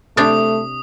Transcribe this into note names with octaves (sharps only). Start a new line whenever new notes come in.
C3 A3 D4 G5 D#6